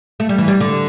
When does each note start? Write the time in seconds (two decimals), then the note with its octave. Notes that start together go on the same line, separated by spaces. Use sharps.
0.20 A3
0.29 G3
0.38 E3
0.48 G3
0.60 D3